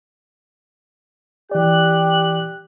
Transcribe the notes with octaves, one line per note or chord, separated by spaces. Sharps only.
E3 G4 D5 F#6